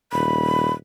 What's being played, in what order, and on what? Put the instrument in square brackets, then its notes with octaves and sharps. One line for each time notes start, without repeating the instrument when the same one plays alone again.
[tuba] D#1 [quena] B5